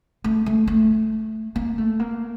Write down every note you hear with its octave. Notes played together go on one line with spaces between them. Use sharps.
A3
A3
A3
A#3
A3
A#3